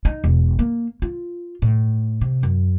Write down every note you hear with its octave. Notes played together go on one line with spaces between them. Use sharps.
D#4
E1
A#3
F4
A2
C3
F#2